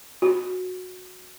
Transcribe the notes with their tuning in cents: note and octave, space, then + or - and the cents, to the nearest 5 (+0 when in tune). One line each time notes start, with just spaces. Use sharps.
F#4 -15